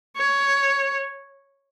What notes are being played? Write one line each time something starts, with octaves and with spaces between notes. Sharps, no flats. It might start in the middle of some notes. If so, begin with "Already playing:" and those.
C#5